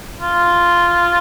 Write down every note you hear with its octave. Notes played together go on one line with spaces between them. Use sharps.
F4